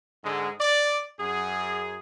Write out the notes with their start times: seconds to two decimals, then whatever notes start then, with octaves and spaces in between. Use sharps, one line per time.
0.24 G#2 D3 G#3
0.61 D5
1.20 F#2 G#4